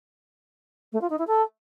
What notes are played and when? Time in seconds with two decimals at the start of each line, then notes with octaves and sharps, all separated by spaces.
0.92 A3
1.01 F4
1.09 D#4
1.18 E4
1.27 A4